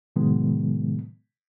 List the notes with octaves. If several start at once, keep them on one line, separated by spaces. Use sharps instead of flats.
A2 C3 D#3 F#3 G#3 B3